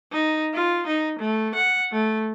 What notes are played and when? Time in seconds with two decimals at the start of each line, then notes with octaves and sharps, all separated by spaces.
0.12 D#4
0.54 F4
0.87 D#4
1.20 A3
1.55 F#5
1.92 A3